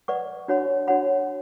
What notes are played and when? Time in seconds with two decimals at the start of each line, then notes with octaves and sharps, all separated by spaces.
0.08 B4 D5 F#5 C#6
0.48 D4 F#4 C#5 F#5 B5
0.88 D4 F#4 C#5 F#5 B5